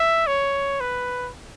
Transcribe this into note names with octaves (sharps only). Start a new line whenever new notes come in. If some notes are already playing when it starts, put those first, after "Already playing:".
Already playing: E5
C#5
B4